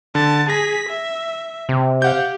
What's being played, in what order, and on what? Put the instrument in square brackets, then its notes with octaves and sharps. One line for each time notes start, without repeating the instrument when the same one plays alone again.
[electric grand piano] D3 [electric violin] A5
[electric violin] G#4 B6 [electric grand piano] A#6
[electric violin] E5
[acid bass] C3
[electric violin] G4 [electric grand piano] F5 F#5 G6